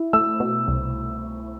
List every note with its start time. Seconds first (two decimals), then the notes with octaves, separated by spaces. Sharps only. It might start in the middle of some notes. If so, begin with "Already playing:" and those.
Already playing: E4
0.13 A3 E6
0.40 B2
0.68 C2